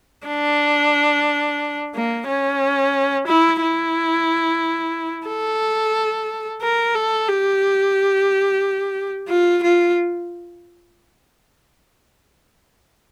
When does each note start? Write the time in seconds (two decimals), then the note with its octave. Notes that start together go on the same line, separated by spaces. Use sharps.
0.27 D4
1.95 A#3
2.28 C#4
3.27 E4
3.62 E4
5.28 A4
6.62 A#4
6.95 A4
7.28 G4
9.29 F4
9.63 F4